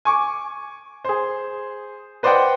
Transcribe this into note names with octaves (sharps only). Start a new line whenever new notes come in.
G#5 C#6 D6
G#4 C5
B4 C5 D5 D#5 F#5 G5